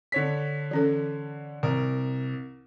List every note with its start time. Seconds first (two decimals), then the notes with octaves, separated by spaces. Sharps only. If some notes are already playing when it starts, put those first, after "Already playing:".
0.12 D3 C#5 B6
0.71 E3 C#4 A4
1.63 C2 A#4